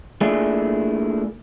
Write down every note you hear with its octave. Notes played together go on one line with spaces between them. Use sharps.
A3 A#3 D4 E4 F4 G#4